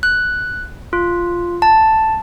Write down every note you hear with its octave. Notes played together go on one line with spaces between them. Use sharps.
F#6
F4
A5